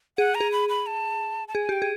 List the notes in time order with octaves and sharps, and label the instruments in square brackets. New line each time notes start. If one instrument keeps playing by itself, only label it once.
[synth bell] G#4 [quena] F#5
[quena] A#5
[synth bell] G#4
[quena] B5
B5
A5
A5
[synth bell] G#4 [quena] G#5
[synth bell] G4 [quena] G5
[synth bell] G#4